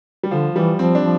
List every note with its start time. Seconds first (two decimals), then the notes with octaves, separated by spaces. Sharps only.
0.23 G3
0.31 D3 F3
0.56 E3 G3
0.79 F3 C4
0.95 D4
1.02 F3